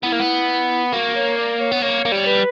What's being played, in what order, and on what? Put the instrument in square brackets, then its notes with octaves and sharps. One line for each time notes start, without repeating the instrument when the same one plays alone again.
[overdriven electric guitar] B3 [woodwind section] E4
[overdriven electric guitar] A#3
B3
[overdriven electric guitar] A#3 [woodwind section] F#4
[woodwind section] C#5
D5
C#5
[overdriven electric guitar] B3
[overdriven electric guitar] A#3 [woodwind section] C#5
[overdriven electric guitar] A#3
G3
[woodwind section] B4